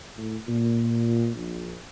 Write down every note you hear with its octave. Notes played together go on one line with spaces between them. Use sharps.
A2
A#2
A#1